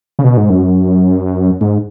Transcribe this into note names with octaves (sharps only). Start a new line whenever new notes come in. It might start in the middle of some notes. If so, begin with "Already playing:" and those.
C#3
B2
G#2
F#2
G#2